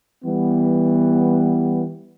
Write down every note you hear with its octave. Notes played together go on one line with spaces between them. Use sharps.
E3 G3 B3